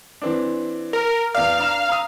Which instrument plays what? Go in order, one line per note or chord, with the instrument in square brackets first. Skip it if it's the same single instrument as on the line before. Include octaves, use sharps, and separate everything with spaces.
[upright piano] E3 C4 D4
[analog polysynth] A#4
[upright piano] E2 D5 [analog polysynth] F5
[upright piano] D4 A#5 E7
A#5 D#6